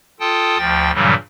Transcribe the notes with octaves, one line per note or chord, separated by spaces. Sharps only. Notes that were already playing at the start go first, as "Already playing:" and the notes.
F4 A4 G5 A5 D#6
D2 F3 G5 A6
G2 A#2 C#3 E3 F#3 G3